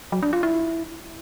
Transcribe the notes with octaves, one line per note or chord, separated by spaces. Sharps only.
F#3
D4
F4
E4